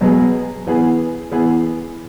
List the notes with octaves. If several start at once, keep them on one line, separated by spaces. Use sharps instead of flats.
B2 F#3 B3 G#4
E3 B3 G#4
E3 B3 G#4